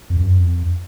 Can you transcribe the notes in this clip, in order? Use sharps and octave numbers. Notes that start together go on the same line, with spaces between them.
F2
F#2
F2